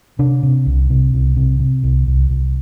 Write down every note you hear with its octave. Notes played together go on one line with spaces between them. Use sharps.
C3 D4
C3
C2
C3
C2
C3
C3
C2
C2
C2